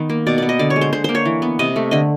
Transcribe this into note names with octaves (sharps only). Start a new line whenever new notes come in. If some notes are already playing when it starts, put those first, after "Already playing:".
Already playing: D#3 B3
A#3
B2 D5
B3 D5
D#5
D3 D5
C#5
G#3
C5
D3 C5
A#3 C5
C#5
E3
B3
C3 D#5
A3
D3 D#5